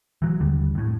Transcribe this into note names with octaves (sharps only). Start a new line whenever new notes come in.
E3 F#3
F1 D#2 D3 G3
F2 A2